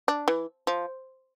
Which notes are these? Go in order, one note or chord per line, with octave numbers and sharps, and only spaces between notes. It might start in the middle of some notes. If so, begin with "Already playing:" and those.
D4
E3
F3